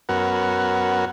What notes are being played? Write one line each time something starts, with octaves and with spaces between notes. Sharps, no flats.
F#2 B3 F#4 A#4